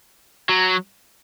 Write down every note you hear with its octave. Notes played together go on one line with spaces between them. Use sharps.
F#3